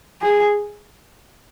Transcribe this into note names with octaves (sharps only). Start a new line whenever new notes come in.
G#4